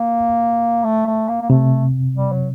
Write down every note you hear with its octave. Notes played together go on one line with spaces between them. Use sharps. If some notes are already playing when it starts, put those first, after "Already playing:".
Already playing: A#3
A3
A3
A#3
A#3
C3 A3
G3
F#3